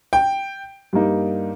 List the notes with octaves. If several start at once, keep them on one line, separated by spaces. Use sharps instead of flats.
G5
G2 G3 A#3 D#4